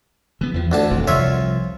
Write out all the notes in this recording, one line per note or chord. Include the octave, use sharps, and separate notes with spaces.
E3 B3
E2 E3 F3
D2 E3 D4 A5
D#1 G#1 F2
C2 F3 F4 C#5 E5